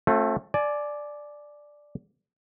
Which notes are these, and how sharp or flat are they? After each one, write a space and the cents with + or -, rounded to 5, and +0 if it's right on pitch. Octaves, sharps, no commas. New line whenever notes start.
A3 +0 C4 +45 F4 +45
D5 +0 G#5 +35